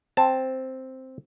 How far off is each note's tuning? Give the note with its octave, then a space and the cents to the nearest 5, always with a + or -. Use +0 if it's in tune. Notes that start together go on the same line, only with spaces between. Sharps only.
C4 +0 A5 +0